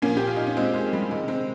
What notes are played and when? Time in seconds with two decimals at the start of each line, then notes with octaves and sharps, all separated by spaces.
0.02 A#2 F3 A#3 C#4
0.17 G4
0.27 F4
0.36 D#4
0.47 C#4
0.57 G#3 C4
0.74 G#3
0.93 G3
1.11 C3 D#3 G#3
1.28 G#3 C4